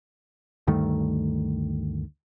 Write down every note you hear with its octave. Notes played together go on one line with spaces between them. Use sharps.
D2 G2 D#3 A3